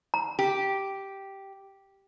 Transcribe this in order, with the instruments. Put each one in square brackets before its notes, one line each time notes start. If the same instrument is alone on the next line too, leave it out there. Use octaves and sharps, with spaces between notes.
[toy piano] A#5
[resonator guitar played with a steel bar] G4